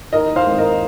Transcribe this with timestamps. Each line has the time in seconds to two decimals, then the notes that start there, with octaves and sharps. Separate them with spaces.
0.13 D#2 A#4 D#5
0.36 C5 F5
0.46 D#3 G#3 C4
0.59 A#4 D#5